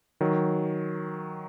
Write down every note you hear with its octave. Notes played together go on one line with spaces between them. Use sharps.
D#3 F#3